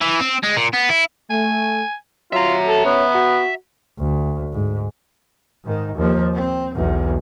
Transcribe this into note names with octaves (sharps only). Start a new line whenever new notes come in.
E3
C4
G#3
A#2
B3
E4
A3 G#5
F#3 F4 E5 A#5
A4
B3 C#4
F#4
D2
G#2
G#2 D#3
D#2 F3
C4
B1 E2